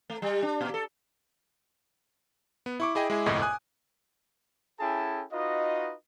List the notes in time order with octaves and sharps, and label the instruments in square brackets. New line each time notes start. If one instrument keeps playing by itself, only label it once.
[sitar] A3
G3
D4
A#2
A4
[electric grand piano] B3
E4 C#6 D6
E4 G#4 D#5 G5
G#3 E4 G#4
G1 C2 F2 A2 D#5
G#5 D#6 F#6
[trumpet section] C#4 E4 G#4 A4 G5 A5
D#4 F4 F#4 B4 D#5